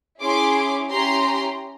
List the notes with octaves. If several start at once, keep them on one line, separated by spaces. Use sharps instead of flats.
C#4 E4 G#4 C6 D6
C#4 E4 G4 A#5 C6